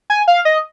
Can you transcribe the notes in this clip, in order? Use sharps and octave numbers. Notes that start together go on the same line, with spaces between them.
G#5
F5
D#5